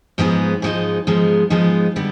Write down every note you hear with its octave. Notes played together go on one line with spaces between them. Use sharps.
G#2 F3 G#3 B3 D#4
G#2 F3 G#3 B3 D#4
G#2 F3 G#3 B3 D#4
G#2 F3 G#3 B3 D#4
D3 G3 B3